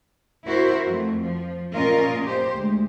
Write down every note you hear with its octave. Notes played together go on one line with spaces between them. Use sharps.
E4 F#4 A#4 C5
F2 A3
F3
A#2 C#4 F4 A#4 D#5
G4 C5
D2 G#3